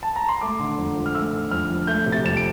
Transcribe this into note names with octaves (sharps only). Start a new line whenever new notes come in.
A5
A#5
C6
A3 D6
D3
F2
F3
F6
A3 E6
D3
F2 F6
F3
A3 G6
C3
A6
F2 E7
D7